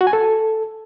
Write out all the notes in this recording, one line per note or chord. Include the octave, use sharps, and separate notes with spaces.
F#4
G#5
A4